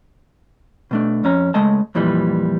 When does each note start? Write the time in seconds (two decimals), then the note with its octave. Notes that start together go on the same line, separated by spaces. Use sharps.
0.91 B2 A3 D4
1.24 F2 C#4 A#5
1.54 C#2 G#3 A3 D#5 A5
1.95 F2 A#2 E3 G3